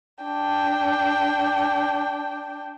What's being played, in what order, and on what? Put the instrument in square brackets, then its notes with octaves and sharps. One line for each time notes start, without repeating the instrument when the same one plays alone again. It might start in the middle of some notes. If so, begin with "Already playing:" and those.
[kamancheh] D4 G5